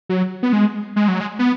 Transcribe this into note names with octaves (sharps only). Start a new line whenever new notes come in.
F#3
B3
G#3
G#3
F#3
G#3
B3